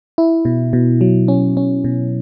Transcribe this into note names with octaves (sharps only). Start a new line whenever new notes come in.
E4
B2
B2
F#3
C#4
C#4
B2